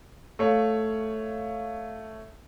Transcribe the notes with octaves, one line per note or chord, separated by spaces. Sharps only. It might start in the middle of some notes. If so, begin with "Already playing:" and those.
A3 C#5 F5